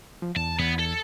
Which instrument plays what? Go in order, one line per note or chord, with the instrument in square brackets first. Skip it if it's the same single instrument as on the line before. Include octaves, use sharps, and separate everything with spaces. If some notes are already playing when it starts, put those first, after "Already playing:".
[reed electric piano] F3
[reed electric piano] E2 [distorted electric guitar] A5
[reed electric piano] E2 G#6 A6 [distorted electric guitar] B3
[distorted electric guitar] A4